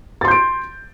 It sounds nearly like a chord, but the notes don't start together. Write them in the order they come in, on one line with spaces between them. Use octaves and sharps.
A6 C6 G6 D7